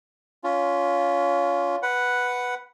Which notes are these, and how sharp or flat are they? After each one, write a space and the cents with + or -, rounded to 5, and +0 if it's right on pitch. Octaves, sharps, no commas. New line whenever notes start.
C#4 +25 F4 +5
B4 +0 F#5 +0